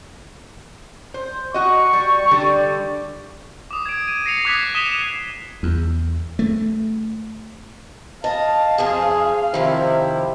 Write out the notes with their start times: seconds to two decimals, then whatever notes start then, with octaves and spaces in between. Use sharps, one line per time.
1.14 C5
1.54 F#4 D#5 C#6
1.93 G3
2.31 D3 G3
3.71 D6 D#6
3.86 G#6 D7
4.08 G#6 D#7
4.26 A#6 C7 C#7 F7
4.45 D6 D#6 F#6 G#6 B6 C7
4.75 D#6 B6 C7 D#7 E7 G7
5.63 E2
6.39 A3
8.24 D#5 F5 A5
8.78 F2 G#4 C5 A5
9.54 C3 D#3 F3 E4